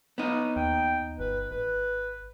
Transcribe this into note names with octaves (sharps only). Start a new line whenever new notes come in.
B3 D#4
D#2 G5
G1 B4
G#1 B4